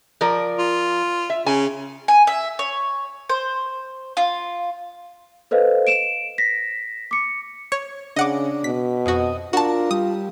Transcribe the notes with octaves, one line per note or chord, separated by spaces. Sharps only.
F3 A#4 D5
F4
E5
C#3 G#5
G#5
E5
C#5
C5
F4
A4 B4 C5 D#5 F5
D7 E7
A#6 B6
D6 C#7
C#5
C#3 D4 D#5 F#5 D6
B2 B6
F2 F#4 D#5
D4 F4 F#4 A#4 A5
G3 D#6